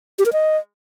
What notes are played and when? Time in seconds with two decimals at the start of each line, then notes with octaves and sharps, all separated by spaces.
0.19 G4
0.26 A#4
0.33 D#5